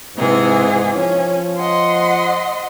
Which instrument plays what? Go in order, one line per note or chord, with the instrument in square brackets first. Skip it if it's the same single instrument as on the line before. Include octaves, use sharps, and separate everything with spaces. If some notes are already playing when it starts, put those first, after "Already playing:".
[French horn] G#2 [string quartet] C3 E3 G#4
[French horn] F3 [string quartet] C#4
[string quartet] D#5 F#5 C6